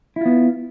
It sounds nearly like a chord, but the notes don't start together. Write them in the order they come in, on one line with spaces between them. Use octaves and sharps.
E4 F4 B3